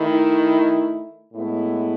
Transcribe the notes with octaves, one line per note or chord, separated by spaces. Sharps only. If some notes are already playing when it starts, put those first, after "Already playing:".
Already playing: D#3 A3 E4
A2 G#3 B3 E4